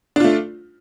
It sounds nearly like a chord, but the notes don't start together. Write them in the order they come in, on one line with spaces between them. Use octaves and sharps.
D4 F4 A3